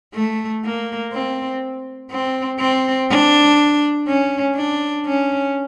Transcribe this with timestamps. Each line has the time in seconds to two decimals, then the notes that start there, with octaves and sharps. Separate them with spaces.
0.14 A3
0.64 A#3
1.13 C4
2.11 C4
2.59 C4
3.10 D4
4.07 C#4
4.56 D4
5.06 C#4